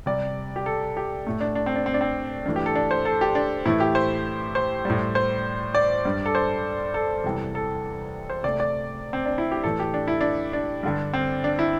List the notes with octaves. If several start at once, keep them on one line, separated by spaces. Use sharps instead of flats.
C3 G3 D5
G4
A4
G4
A2 A3
D4
D4
C4
D4
C4
D4
C4
G2 E3 A3 D4
G4
A4
D4
C5
A4
G4
D4
A2 E3 A3 E4
G4
C5
C5
A2 G3
C5
D5
G2 G3
A4
C5
A4
E2 C3 E3 G3
A4
C5
C3 A3 D5
D5
C4
D4
E4
G4
A2 E3 A3 A4
G4
D4
E4
D4
D4
G2 D3 G3
C4
D4
E4